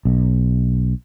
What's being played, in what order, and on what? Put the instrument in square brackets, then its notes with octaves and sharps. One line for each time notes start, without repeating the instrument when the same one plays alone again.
[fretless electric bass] B1